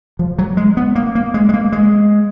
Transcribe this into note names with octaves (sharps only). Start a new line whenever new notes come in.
F3
F#3
G#3
B3
A#3
A#3
G#3
G#3
A#3
G#3